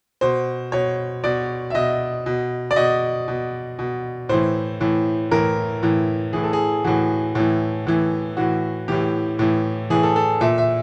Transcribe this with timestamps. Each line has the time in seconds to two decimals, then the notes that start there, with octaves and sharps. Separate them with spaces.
0.21 B2 C5
0.72 B2 C#5
1.24 B2 D5
1.70 E5
1.74 B2 D#5
2.26 B2
2.71 D5
2.76 B2 D#5
3.28 B2
3.79 B2
4.29 A2 E3 C5
4.80 A2 E3
5.31 A2 E3 A#4
5.83 A2 E3
6.33 A2 E3 G#4
6.43 A4
6.53 G#4
6.84 A2 E3 F#4
7.35 A2 E3
7.87 A2 E3
8.37 A2 E3 F#4
8.88 A2 E3 G4
9.39 A2 E3
9.90 A2 E3 G#4
10.03 A4
10.16 A4
10.41 A#2 E5
10.58 E5